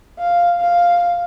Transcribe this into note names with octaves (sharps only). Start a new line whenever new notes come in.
F5
F5